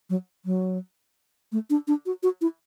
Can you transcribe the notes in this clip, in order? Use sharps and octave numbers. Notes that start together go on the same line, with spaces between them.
F#3
F#3
A3
D4
D4
F#4
F#4
E4